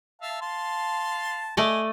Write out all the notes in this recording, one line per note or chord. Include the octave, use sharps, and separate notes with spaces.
E5 F5 A5
F5 A5 C6
A3 D5 D#5 G#5